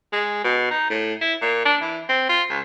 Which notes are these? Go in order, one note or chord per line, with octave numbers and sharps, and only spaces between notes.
G#3
B2
D#4
A2
E4
A#2
D4
E3
C4
F4
C#2